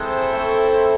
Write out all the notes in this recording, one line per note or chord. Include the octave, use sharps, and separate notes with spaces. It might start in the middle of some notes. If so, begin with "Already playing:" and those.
Already playing: G#3 C4 E4 A4 C5
A3